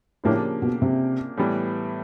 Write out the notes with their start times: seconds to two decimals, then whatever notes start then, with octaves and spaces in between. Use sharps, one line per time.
0.24 A2 C#3 F3 A#3 D4 G4
0.62 B2
0.82 C3
1.37 A2 E3 G3 B3